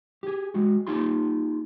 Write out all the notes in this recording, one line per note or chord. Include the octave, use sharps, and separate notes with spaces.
G4 G#4
G#3 F#4
A#3 D#4 F4 G4 C6